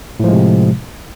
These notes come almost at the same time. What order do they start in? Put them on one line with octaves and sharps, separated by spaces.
A2 F3 G#3 C3